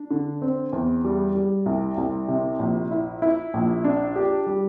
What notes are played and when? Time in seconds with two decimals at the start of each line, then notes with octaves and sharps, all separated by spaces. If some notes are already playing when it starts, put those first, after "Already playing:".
Already playing: D4
0.11 D3
0.42 C4
0.73 E2
1.05 G3
1.35 G3
1.66 C2
1.98 C2
2.28 C3
2.59 A#1
2.91 E4
3.22 E4
3.54 A#1
3.84 D4
4.16 G4
4.47 G3